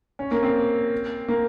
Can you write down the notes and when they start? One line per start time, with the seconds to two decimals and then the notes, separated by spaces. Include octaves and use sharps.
0.19 C#4
0.31 A#3
0.43 C4
1.28 A#3